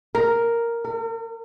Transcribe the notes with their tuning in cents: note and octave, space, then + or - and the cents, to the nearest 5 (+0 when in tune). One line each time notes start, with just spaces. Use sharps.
A#4 +0
A#4 -40